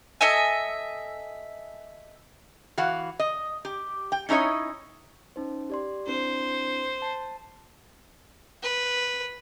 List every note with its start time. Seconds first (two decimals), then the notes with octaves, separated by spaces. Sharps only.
0.21 A4 D#5 E5 G#5
2.78 E3 F#4 F5 F#5
3.20 D#5
3.65 G4
4.12 G5
4.29 C#4 D#4 E4 C#5 D#5
5.36 C#4 D#4 C5
5.70 G4 D5 C6
6.07 C4 D4 E4 C5
7.02 A5
8.63 B4